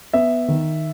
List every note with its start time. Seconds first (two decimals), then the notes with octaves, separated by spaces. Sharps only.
0.13 B3 E5
0.48 D#3